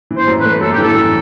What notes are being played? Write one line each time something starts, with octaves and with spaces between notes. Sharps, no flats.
E3
C5
F#2
B4
A3
F#2 A4
G4
E3
A4
F#2